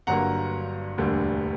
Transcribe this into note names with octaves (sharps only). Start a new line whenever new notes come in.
G1 G2 D3 F#3 A#3 F#5 A#5
E1 D2 D3 G3 A#3